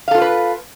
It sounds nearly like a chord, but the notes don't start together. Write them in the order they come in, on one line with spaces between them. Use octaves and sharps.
F5 A4 F4 C5 B4